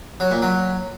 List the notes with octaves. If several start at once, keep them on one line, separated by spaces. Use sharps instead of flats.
F#3
A#2
F#3